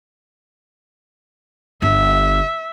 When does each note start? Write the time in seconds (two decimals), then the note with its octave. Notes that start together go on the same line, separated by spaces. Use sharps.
1.82 G1 D4 E5